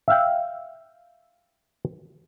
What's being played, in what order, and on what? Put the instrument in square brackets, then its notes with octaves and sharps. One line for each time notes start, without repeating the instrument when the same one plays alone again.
[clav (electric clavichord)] E5 F5 G5